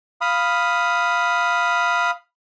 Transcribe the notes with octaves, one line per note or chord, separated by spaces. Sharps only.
F5 B5 D#6